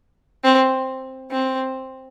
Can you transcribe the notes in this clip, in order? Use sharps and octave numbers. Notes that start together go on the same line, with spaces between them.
C4
C4